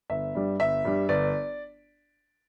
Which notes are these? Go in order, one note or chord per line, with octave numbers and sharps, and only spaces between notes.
G1 E5
G2 G3
G1 E5
G2 G3
G1 D5